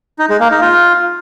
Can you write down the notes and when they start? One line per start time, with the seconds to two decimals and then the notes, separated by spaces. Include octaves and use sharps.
0.19 D#4
0.30 G#3
0.40 A#3
0.51 D#4
0.62 F4